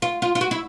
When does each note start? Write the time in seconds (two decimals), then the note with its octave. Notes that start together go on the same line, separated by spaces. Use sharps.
0.02 F4
0.22 F4
0.35 F4
0.41 F#4
0.51 E4